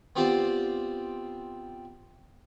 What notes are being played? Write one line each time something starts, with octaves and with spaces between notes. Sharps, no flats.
B3 C4 F4 G4 C5 D5